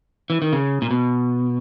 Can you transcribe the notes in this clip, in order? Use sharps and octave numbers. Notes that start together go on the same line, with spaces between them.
E3
D#3
C#3
A#2
B2